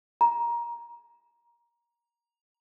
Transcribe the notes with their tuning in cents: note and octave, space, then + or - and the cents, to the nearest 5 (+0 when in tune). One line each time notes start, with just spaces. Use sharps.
A#5 +20